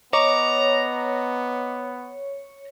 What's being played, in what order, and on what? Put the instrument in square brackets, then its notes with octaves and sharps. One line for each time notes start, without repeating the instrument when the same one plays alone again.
[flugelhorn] B3 [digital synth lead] C#5 [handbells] D#5 D6 [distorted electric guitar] A#5